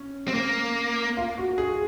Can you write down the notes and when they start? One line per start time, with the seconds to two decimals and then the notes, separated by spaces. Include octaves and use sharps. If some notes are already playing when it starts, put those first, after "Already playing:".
Already playing: C#4
0.28 C4
0.34 A#3
1.17 F4
1.38 F#4
1.58 G#4